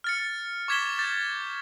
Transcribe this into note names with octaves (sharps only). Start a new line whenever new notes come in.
F6 A6 C#7
C#6 D6 G#6 B6 E7 G7
D6 G6 A6